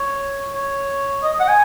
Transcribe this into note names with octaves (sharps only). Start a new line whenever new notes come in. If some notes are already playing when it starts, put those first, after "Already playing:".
Already playing: C#5
C#5
D#5
F#5
G#5